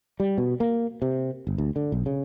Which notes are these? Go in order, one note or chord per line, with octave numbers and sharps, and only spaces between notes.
G3
B2
A#3
C3
G1
D2
D3
B1
C#3